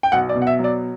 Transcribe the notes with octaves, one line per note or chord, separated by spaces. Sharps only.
G5
B1 F#5
D5
B2
F#5
E5
F#3
D5